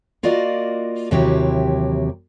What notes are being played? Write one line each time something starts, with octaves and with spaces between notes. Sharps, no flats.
A#3 F4 F#4 A#4 D5 D#5
D#2 C3 E3 F#3 E4 G4